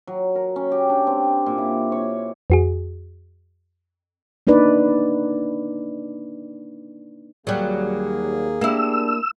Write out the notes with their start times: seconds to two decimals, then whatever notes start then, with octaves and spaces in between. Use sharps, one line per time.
0.07 F#3
0.35 A#4
0.56 C#4
0.72 G4
0.89 D4
1.07 C4
1.46 A#2
1.58 E4
1.92 C#5
2.50 F2 F#4 G#4
4.47 A#3 D4 D#4 B4 D5
7.47 D#2 F#3 G3 A#3 G#4
8.61 A#3 D4 E4 G4 E6